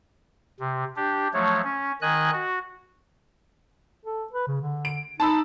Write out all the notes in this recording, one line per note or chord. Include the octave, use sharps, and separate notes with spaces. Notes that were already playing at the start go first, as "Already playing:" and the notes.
C3
D4 G4
F3 F#3 A3 C#5
C#4
D#3 D#5 G#5 F#6
F#4
A4
B4
C#3
D3
D7
D#4 A5 B5 E6